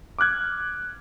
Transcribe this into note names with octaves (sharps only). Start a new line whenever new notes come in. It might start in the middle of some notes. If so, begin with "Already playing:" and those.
D6 F6 F#6 G#6